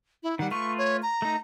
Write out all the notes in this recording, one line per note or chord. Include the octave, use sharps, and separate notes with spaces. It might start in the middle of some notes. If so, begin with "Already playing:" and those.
E4
D#3 G3 F#5
A3 F4 B4 C#6
C#5
A#5
A3 D#4